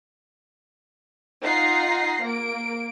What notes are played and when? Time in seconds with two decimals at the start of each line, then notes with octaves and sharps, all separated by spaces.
1.43 D#4 F4 F#5 A#5 A#6 C7
2.23 A#3 D7